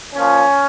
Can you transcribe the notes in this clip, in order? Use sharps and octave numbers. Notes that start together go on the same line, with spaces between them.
A#2 F3 C#4